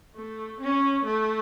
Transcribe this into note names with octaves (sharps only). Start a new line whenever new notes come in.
A3
C#4
A3